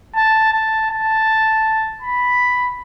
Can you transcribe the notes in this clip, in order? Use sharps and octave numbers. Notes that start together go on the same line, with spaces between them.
A5
A5
A5
B5